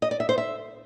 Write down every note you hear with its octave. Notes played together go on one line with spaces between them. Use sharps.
D#5
D5
E5
C5
E5